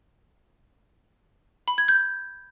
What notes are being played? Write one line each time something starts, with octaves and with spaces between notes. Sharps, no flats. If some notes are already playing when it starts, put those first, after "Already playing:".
B5
G#6
G6